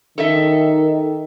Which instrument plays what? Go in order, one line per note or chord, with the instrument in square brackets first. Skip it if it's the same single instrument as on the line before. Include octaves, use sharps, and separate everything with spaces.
[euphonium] D#3 [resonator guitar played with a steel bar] A4 D#5 E5